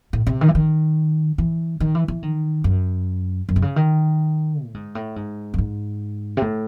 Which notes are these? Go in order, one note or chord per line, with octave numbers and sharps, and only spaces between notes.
A2
C3
D#3
E3
D#3
E3
D#3
E3
E3
D#3
F#2
F#2
C3
C#3
D#3
A2
G#2
A2
G#2
F#2
G#2
C3
A2